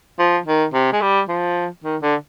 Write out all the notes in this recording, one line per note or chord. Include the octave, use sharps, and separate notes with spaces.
F3
D#3
C3
G#3
G3
F3
D#3
D3